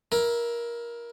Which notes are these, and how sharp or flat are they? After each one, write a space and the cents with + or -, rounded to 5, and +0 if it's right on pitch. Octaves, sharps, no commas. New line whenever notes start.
E4 +0 A#4 +15